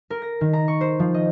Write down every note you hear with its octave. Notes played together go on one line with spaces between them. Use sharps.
A#4
A#6
D#3
A#5
C#6
C5
F3
D#5